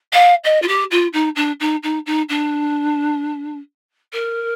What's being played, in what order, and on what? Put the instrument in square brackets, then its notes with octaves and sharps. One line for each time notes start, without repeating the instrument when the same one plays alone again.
[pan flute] F5
D#5
F4
G4
F4
D#4
D4
D#4
D#4
D#4
D4
A#4